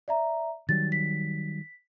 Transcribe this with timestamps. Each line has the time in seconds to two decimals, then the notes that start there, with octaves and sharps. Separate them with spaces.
0.08 D5 E5 A#5
0.69 D#3 F#3 G3 A6
0.92 B6